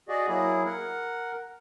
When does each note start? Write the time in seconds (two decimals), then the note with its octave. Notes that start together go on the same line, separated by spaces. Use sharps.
0.09 F#4 G#4 D5 D#5
0.28 F#3 A#3 E4 G#4
0.65 A#4 F#5